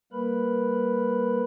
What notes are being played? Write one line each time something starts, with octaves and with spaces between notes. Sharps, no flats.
G3 A#3 A#4 B4 B5